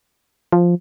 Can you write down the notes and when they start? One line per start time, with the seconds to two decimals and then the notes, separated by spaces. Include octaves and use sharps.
0.52 F3